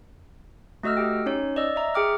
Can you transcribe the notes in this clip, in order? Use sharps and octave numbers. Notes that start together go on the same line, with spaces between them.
A3 F#4 D#5 E6 F6
G4 G5
C#4 D#4 C#5
D5 D#5 E6
E5 A#5
G#4 G5 D6 F6